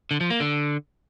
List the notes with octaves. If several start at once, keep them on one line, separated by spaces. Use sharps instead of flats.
D3
F3
A#3
D3